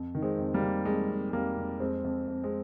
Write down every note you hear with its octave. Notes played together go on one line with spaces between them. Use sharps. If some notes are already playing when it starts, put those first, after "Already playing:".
Already playing: F2
D#3
G#3 C4
F2
G3 A#3
D#3
F2 G#3
F2
G#3
F2 G3 A#3
F2
F2 G#3 C4
F2
F2
G#3 C4